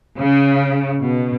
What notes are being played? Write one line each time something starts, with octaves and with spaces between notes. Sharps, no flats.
C#3
B2